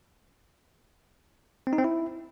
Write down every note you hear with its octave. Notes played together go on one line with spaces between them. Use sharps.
C4
D#4
C4
E4